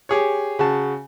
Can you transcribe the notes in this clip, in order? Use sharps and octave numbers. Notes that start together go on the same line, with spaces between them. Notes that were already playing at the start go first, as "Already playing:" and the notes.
G4 G#4 C#5
C#3 F#4 A5